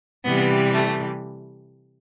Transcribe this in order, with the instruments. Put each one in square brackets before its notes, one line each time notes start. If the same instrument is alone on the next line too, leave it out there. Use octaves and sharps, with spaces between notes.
[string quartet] C3 E3 G3 B3
A3